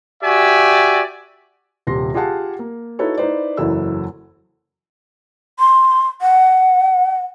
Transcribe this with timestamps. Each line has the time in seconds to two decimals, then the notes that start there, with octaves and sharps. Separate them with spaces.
0.23 F#4 G4 D5 E5 G#5
1.87 D#1 C3 C6 A#6
2.14 F4 G4 G#4 F5 F#5 A5
2.59 A#3
2.99 D#4 E4 F#4 A4 B4 C#5
3.17 D#4 E4 B4 C5 D5
3.57 F#1 E2 F#3 E4 A4 E6
5.60 C6
6.22 F#5